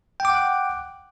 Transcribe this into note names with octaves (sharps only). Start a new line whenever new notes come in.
F#5 G5 D6 F#6